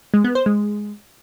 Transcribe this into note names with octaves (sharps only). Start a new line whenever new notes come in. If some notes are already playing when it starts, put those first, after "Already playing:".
G#3
B3
C5
G#3